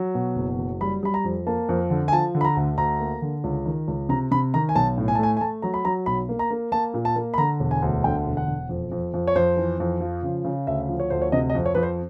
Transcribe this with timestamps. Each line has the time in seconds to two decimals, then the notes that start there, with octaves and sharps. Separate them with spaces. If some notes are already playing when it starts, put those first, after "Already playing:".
Already playing: F#3
0.15 B2
0.36 F#1
0.59 F#3
0.81 G3 B5
1.03 G3 B5
1.14 A#5
1.24 F2
1.47 A#3 A5
1.69 F2
1.90 D3
2.08 G#5
2.12 F3 A5
2.35 D3
2.41 B5
2.45 A#5
2.57 D2
2.78 D2 A#5
3.00 A#3
3.22 D3
3.44 C#2
3.65 D#3
3.88 C#2
4.09 C3 A#5
4.31 C3 B5
4.54 D#3 A#5
4.69 G#5
4.75 B1 A5
4.98 A2
5.08 G#5
5.15 A5
5.19 A3 G#5
5.37 G#5
5.41 A3 A5
5.62 F#3 A#5
5.74 B5
5.85 F#3 A#5
6.06 B1 B5
6.29 A#3
6.39 A#5
6.51 A#3
6.72 A#3 A5
6.94 A#2
7.05 A5
7.16 A#3
7.34 B5
7.38 D3 A#5
7.60 E1
7.71 G#5
7.82 D2
8.04 D3 G5
8.26 E1
8.37 F#5
8.47 E1
8.69 F2
8.92 F2
9.14 F2
9.27 C#5
9.35 F2 C5
9.57 E3
9.80 F2
10.01 F3
10.23 C#3
10.45 C#3
10.67 D2 E5
10.89 F3
11.00 C#5
11.10 D2 C5
11.22 C#5
11.32 C3 D#5
11.50 D#5
11.55 F2
11.66 C#5
11.75 F2 B4
11.83 C5